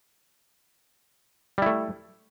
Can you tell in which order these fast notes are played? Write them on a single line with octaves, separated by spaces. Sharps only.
G3 E4 A3